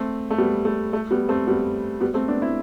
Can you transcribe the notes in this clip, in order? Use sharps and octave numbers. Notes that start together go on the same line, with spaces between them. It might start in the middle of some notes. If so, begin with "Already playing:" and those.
Already playing: A3 C4
A3
G3 B3
A3
A3
G3 B3
A3 C4
G3 B3
G3 B3
A3 C4
B3 D4
C4 E4